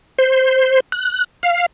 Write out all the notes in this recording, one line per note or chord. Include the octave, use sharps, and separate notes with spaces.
C5
F#6
F5